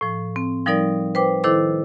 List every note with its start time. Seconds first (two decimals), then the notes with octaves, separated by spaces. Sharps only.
0.01 A2 F3
0.36 C4
0.66 F3 G3 D#4 A#4 D5
1.15 B4 C5 G5 D6
1.44 D#3 E4 A4 C5 D6